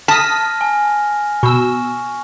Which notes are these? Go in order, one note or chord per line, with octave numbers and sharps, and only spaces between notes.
A5 D#6 F6 A#6 B6
G#5
B2 C#6 E6